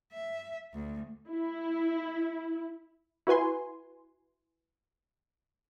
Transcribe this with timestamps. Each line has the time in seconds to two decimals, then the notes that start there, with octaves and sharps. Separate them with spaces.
0.12 E5
0.73 D2
1.28 E4
3.27 E4 F#4 B4 G#5 C6